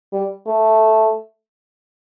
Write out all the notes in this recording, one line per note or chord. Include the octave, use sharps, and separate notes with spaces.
G3
A3